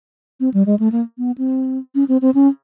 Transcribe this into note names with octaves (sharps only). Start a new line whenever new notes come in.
C4
G3
G#3
A3
A#3
B3
C4
C#4
C4
C4
C#4